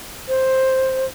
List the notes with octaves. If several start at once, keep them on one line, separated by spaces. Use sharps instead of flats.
C5